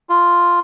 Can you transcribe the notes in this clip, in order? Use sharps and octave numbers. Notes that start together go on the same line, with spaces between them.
F4